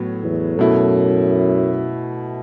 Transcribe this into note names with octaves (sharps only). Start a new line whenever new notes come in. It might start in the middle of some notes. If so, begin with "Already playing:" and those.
Already playing: A2 F#3 B3
E2
F#2 B2 A3 E4